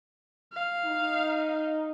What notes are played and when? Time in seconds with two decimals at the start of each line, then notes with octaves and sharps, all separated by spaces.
0.53 F5
0.85 D#4